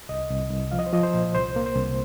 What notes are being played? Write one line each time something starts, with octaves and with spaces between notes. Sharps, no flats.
C2 D#5
C2
C2
F3 F5
D#5
C5
F3 D#5
C5
A#2
C2 C5
A#3
C5
C2